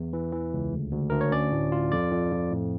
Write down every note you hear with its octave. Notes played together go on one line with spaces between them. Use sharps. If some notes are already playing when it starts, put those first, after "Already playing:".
Already playing: E2
E3
E3
C#2
D2
D2
D2 A#4
C#5
C#4 D5
A2
F4
F2 D5
F2
F2
A2